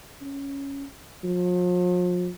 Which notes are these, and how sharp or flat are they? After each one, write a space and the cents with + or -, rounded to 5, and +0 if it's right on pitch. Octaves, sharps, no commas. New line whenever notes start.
C#4 +0
F3 +40